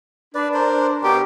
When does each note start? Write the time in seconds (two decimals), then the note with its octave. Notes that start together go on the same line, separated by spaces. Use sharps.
0.35 D4 B4 D5
0.54 A#4 C5
1.03 B2 G4 A#4